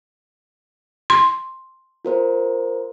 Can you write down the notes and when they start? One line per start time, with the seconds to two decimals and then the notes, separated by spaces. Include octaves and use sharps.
1.10 C6
2.05 F4 A#4 C5